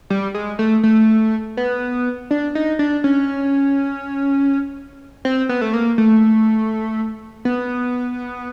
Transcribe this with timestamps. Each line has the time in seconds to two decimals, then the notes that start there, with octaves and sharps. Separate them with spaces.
0.10 G3
0.34 G#3
0.59 A3
0.83 A3
1.57 B3
2.31 D4
2.55 D#4
2.79 D4
3.04 C#4
5.25 C4
5.49 B3
5.61 A3
5.74 A#3
5.98 A3
7.45 B3